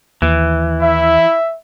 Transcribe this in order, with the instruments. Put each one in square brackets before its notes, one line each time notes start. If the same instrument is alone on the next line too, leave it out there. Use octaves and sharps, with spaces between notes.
[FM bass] D#2 [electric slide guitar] E3
[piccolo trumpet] E4 [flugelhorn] E5